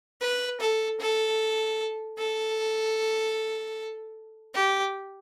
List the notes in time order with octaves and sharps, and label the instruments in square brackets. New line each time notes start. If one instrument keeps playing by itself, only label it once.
[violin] B4
A4
A4
A4
G4